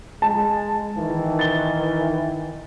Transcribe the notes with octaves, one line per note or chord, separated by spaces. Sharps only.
G#3 A5
D#3 E3
A6 G7